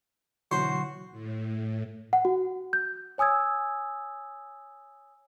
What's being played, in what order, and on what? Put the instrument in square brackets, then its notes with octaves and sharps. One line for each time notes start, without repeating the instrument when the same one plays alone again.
[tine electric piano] B2 E3 F#3 [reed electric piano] D3 E4 C#6 [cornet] F#4 [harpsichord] C5
[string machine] A2
[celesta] F#5
F#4
G6
C#5 G#5 D#6 E6 G#6